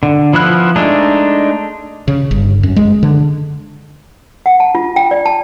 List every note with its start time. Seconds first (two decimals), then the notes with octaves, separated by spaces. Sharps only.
0.03 D3
0.33 F3 B3 E4 F#6
0.76 G#3 A3 D4 D#4
2.08 C#3
2.31 G1
2.63 F#2
2.76 G#3
3.03 D3
4.46 F#5
4.60 A5
4.75 F4
4.96 G5
5.11 D5
5.26 A5